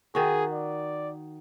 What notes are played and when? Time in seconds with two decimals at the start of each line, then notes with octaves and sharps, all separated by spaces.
0.15 D#3 F#4 G#4
0.53 D5